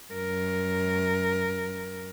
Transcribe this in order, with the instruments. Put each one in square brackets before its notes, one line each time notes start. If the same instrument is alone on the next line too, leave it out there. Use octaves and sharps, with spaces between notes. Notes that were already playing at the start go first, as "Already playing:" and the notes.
[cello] F#2 A#4